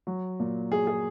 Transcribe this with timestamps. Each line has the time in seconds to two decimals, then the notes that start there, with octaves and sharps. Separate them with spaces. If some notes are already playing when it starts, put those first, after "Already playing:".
0.07 F#3
0.39 A#2
0.72 F#3 G#4
0.87 G#4